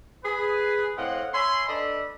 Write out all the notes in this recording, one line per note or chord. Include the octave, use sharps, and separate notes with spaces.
G#4 B4
A2 C4 D#5 F5 F#5
C#5 E5 G#5 B5 C6
D4 A4 B4 D5 D#5 B5